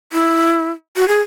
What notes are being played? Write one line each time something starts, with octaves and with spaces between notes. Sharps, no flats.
E4
F#4
G#4